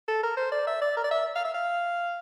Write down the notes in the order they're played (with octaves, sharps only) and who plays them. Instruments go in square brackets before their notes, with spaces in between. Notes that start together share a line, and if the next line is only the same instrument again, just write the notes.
[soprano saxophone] A4
A#4
C5
D5
E5
D5
A#4
D5
E5
F5
E5
F5